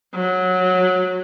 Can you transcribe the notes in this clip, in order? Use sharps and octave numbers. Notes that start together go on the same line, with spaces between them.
F#3